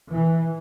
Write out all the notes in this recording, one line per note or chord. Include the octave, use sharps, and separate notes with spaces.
E3